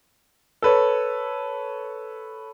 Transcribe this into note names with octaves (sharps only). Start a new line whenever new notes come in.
A4 B4 C#5